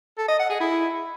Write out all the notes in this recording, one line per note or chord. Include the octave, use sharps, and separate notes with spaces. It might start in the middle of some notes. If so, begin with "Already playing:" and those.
A4
D#5
F#5
G#4
E4